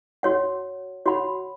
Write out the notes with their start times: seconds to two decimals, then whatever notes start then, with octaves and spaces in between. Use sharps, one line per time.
0.23 F#4 C#5 F#5
1.06 F#4 C#5 F#5 B5